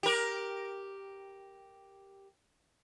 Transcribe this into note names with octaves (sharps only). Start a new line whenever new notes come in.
G4 A#4